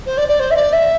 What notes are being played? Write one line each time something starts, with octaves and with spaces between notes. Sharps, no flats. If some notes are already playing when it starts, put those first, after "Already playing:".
C5
D5
D5
C5
E5
D5
E5